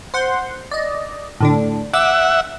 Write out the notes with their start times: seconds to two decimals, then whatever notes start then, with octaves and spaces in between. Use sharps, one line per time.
0.14 C5 F#5 C6
0.71 D5 D#5
1.40 A2 D3 D4
1.94 E5 F#5 D6 E6